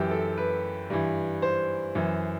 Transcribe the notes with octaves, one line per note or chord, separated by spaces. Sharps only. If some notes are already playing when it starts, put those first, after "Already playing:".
Already playing: F#2 E3 G4
A4
B4
G2 E3
C5
F#2 E3